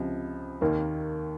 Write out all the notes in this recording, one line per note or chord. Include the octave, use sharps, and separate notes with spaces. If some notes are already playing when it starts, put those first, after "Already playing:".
Already playing: C#2 C3 F3 G4
D#2 D#3 A#3